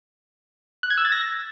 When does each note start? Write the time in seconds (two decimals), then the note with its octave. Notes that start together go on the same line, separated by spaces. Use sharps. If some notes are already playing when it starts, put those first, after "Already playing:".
0.83 F#6
0.90 G#6
0.98 E6
1.05 A6
1.12 A#6